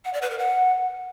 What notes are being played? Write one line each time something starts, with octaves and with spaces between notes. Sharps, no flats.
F#5
D5
B4
A#4
F#5